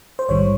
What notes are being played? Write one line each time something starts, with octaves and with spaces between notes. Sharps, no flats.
C5
A#1 G#2 D#3 G3 C#5